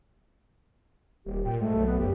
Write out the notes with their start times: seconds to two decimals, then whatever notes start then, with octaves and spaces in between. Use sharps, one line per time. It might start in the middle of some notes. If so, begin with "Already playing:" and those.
1.26 D#1 G4
1.44 A#2 G5
1.60 G#2 A3
1.74 B1
1.86 B3
1.98 F#1 G4